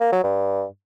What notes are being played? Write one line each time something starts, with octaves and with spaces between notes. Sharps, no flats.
A#3
F#3
G2